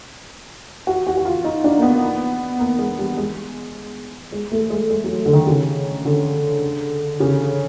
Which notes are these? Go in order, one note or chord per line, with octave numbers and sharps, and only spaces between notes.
F#4
F#4
F#4
F4
D#4
D4
A#3
B3
A#3
G#3
G3
G#3
G#3
A3
G#3
G#3
F#3
D3
D#3
C#3
D3
C#3